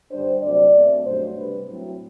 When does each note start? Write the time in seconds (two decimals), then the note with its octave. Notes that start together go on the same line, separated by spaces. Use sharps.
0.11 G2 D3 G3 D4 C5
0.43 D2 C3 F#3 D5
0.74 B2 A3 C4
1.05 G2 F#3 A3 D4 C5
1.36 C3 G3 D4 B4
1.68 A2 F#3 C4